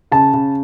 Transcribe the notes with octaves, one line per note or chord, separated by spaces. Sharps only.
C#3 A5
C#3